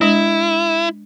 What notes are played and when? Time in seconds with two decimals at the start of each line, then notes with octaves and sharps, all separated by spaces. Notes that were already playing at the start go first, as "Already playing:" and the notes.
0.01 G#3 D4 E4